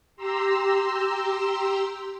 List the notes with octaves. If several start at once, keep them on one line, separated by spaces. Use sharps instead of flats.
G4 A#5 C6 E6